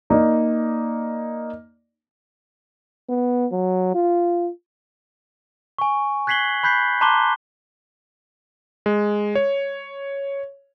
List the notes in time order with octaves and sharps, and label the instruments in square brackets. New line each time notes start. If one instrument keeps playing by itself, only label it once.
[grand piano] A#3 D#4 D5
[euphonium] B3
F#3
F4
[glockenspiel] G#5 C#6
F#6 G#6 B6 C7 F#7 G7
B5 F#6 G6 B6 C7
A5 A#5 C6 D6 F#6 G7
[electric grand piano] G#3
C#5